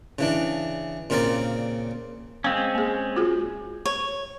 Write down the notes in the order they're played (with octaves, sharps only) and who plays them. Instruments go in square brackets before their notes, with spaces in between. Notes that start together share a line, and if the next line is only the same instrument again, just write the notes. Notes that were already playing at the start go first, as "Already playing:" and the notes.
[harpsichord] C#3 E3 D4
A#2 C#3 C4 A#4 D5
[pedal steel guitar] G#3 C4 C#4 [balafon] F5
[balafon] A#3 G#4
F4 F#4 G#4
[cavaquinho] C#5